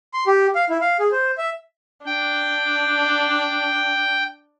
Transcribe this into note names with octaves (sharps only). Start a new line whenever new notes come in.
C6
G4
F5
E4
F5
G#4
C5
E5
D4 G5